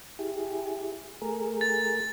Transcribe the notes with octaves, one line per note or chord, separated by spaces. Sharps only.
E4 G4 G#4
A3 G#4 A#4
A6